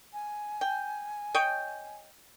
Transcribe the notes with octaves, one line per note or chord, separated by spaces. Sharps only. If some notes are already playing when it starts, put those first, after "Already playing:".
G#5
G5
C#5 D#5 G5